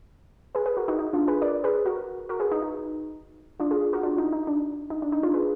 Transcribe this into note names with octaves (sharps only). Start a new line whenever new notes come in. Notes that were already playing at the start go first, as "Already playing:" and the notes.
G#4 B4
G#4 B4
F#4 A#4
D#4 F#4
D#4
D4 F4
G#4 B4
A#4 D5
G#4 B4
F#4 A#4
F#4 A#4
G#4 B4
D#4
D#4
D4 F4
F4 G#4
F#4 A#4
D4 F4
D#4
D#4
D4
D#4
D4
D#4
D4 F4
G#4 B4